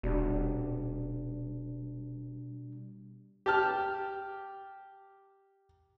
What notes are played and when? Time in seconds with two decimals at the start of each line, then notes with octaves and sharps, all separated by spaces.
0.03 D#1 B2 G3 D4
3.46 G4 A5 F6